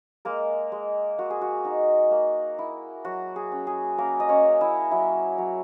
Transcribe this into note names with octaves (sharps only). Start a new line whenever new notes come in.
G#3 A#3 A#4
G#3
A#3 F#4
G#4
F#4
D#4
A#3
E4
F#3 F#4
G#4
C#4
G#4
A#3 C#4 A#4
D#5
C#4 C#5
C#4
E4 E5
F#3 E4 E5
F#3